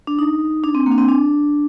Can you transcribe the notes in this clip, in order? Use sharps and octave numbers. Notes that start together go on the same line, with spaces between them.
D4
D#4
D4
C4
A#3
D4
C4
D4